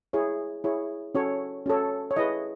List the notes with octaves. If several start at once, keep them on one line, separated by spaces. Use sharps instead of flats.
E4 G#4 C#5
E4 G#4 C#5
C#4 F#4 A4 C#5
C#4 F#4 A4 C#5
C#5
E4 G#4 B4 D#5